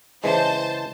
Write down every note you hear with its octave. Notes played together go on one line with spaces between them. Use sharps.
C#3 E3 G#3 C5 A5